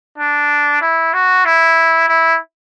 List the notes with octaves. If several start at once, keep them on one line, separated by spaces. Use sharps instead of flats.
D4
E4
F#4
E4
E4